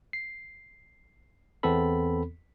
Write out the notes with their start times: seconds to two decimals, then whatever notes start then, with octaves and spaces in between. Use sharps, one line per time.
0.13 C7
1.63 E2 E3 B3 C4 A4 B5